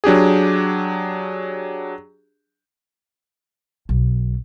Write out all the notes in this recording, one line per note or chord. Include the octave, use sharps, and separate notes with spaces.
F#3 D4 G4 G#4
B1